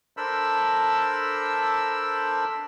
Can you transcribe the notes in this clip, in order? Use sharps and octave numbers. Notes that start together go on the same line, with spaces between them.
D4 A4 A#4 C5 B5 E6